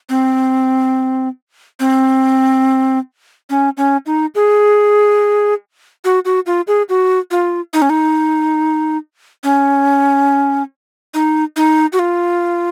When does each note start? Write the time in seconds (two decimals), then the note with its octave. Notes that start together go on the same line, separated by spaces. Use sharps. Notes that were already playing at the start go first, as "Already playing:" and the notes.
0.09 C4
1.80 C4
3.50 C#4
3.77 C#4
4.06 D#4
4.35 G#4
6.05 F#4
6.25 F#4
6.46 F4
6.68 G#4
6.89 F#4
7.31 F4
7.73 D#4
7.82 C#4
7.90 D#4
9.44 C#4
11.14 D#4
11.56 D#4
11.93 F#4
11.99 F4